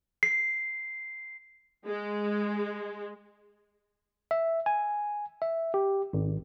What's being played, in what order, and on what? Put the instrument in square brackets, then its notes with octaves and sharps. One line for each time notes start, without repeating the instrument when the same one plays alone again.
[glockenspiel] C7
[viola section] G#3
[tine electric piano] E5
G#5
E5
G4
G#1